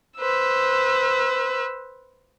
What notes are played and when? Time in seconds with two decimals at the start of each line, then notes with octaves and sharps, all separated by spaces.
0.18 B4 C5 E6